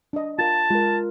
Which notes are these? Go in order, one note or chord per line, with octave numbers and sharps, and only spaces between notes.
D4 D#5
F4 A#4 A5
G#3 F4 A#4